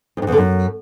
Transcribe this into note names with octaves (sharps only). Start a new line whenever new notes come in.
E2
G2
E2
D3
F#2